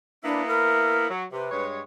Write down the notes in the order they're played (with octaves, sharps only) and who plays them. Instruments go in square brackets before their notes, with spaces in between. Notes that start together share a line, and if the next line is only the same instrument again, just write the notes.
[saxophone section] A#3 B3 E4 [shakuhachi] D4
[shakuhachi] A#4
[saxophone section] F#3
[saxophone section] C3 [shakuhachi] B4
[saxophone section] G2 G#3 C#5